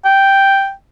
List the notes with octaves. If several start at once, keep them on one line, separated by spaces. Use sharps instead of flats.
G5